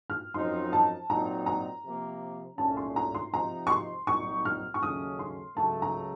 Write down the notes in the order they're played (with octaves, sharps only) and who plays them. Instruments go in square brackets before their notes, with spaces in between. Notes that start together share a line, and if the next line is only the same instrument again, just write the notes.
[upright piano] F6
[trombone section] F#2 F3 C4 D#4 [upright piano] C6
[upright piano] A5
[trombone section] A#2 F#3 C4 D#4 [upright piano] A#5
[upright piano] A#5
[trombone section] C3 F3 A#3
[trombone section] C2 A#2 A3 C#4 [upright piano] A5
[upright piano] C6
A#5
C6
[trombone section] C3 F3 C4 D#4 [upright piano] A#5
[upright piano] C#6
C6
[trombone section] C2 A#2 F#3 C4 D#4 [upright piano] C#6
[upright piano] F6
C#6
[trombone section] D#2 C#3 F#3 A3 C#4 [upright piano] D#6
[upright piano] C6
[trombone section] C#2 C#3 F#3 A3 [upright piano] A5
[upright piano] A#5